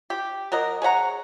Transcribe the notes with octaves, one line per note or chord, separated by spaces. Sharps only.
G4
F#3 A#4 D#5
G#4 C#5 F#5 A#5